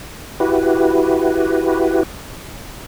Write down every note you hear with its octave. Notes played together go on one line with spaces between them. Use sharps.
E4 F#4 G4 B4